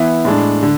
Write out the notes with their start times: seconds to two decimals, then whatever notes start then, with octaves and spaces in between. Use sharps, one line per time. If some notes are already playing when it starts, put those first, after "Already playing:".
Already playing: E3 B3 E4
0.25 A2 G#3 D4
0.63 D3